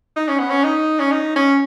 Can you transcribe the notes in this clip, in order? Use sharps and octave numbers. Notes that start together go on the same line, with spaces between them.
D#4
C#4
B3
C#4
D#4
C#4
D#4
C#4